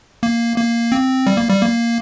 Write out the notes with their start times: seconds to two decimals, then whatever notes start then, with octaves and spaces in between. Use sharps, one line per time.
0.23 A#3
0.58 A#3
0.92 C4
1.27 G3
1.37 A#3
1.49 G3
1.62 A#3